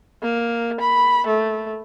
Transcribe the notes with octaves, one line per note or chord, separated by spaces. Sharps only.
A#3
B5
A3